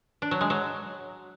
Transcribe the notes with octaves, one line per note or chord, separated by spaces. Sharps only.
D4
F#3
G#3
F#3